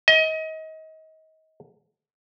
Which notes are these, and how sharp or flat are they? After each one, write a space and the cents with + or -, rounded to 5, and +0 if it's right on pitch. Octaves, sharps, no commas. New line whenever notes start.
D#5 +30